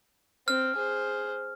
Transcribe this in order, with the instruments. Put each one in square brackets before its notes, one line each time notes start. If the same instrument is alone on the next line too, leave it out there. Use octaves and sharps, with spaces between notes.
[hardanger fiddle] C4 [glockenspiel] F6
[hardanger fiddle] G#4 C5